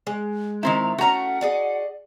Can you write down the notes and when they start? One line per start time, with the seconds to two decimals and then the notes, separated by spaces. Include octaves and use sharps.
0.07 G#3
0.63 D#3 C4 E4 A#5
0.98 A3 C#4 F#4 F#5 A#5
1.41 G#4 D5 D#5